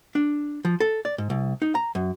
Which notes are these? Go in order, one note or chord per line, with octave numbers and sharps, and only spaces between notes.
D4
F3
A4
D5
G#2
C2
D#4
A#5
F#2